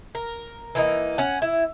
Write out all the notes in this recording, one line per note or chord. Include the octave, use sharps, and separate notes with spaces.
A#4
E3 A#3 D#4
C#4 F#5
E4